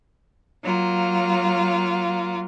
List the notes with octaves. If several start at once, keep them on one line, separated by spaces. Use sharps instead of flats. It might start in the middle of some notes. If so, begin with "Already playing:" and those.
F#3 A#3 F4